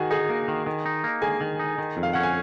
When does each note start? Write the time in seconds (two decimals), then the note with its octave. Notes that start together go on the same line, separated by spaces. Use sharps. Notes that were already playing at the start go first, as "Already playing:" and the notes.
Already playing: D#3 F#4 G#4 G#5
0.11 D#4 G#4 G#5
0.29 A#3
0.48 D#3
0.66 D#3
0.86 D#4
1.04 A#3
1.22 D#3 G#4 G#5
1.41 D#3
1.59 D#4
1.78 D#3
1.97 F2
2.03 F5
2.13 C#4 F#5
2.23 G#5